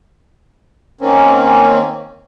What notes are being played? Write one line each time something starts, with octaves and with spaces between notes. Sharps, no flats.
D#3 A#3 C4 C#4